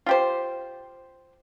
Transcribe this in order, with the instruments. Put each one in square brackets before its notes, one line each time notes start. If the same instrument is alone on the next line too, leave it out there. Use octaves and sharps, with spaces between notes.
[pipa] F4 G4 C5